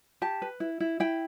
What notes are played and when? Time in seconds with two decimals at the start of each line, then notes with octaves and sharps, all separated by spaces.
0.22 G4 A5
0.42 B4
0.60 E4
0.80 E4
1.00 E4 G5